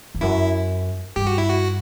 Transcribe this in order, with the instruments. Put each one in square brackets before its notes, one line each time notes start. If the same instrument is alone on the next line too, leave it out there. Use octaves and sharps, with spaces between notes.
[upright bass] E2
[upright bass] F#2 [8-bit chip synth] E4
[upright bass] G2 [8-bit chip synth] G4
[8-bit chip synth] F#4
E4
F#4